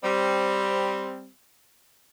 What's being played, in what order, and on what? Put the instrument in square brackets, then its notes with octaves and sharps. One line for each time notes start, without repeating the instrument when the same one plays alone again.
[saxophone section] G3 C4